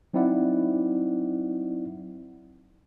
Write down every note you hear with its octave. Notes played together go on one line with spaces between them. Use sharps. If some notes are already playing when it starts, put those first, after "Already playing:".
F#3 C4 D#4 E4 D5 F#5